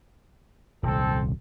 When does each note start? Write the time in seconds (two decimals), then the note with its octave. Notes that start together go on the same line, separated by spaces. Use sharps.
0.83 D#1 C2 C4 A4